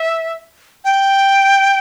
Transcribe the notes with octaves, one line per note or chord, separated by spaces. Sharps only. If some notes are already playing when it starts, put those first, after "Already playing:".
Already playing: E5
G5